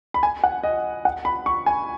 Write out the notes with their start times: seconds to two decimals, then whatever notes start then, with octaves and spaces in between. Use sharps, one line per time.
0.14 B5
0.23 G#5
0.44 F#5
0.63 D#5
1.05 F#5
1.25 B5
1.46 C#6
1.66 G#5